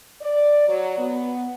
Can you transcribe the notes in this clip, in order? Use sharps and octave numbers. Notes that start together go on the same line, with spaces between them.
D5
F#3
B3